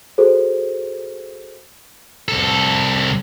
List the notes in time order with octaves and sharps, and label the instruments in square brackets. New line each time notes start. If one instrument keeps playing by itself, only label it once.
[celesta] F#4 G#4 A4 C5
[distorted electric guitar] C2 A4